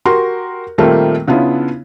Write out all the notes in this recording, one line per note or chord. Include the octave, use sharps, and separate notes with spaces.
F#4 G4 A#4 C6
A#2 D#3 G3 A3 A#3 C4
C#3 B3 D4 E4 F4